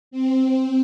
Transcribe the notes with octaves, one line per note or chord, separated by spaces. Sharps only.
C4